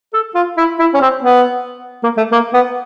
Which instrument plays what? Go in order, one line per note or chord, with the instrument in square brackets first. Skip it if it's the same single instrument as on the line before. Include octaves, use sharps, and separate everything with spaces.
[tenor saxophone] A4
F4
E4
E4
C#4
C4
B3
A#3
A3
A#3
B3